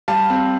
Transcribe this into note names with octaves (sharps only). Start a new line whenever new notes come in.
G3 F5 A5
C4